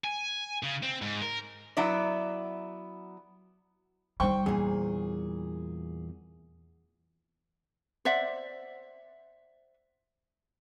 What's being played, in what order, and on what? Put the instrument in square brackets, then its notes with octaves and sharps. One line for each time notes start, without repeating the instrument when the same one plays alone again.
[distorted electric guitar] G#5
C#3
C4
G#2
A#4
[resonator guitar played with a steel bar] F#3 B3 E4 D5
[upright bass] G3 D#4 [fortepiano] C5 G5 C#6
[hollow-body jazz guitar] E2 A#2 [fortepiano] G#4
[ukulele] C5 D5 E5 F#5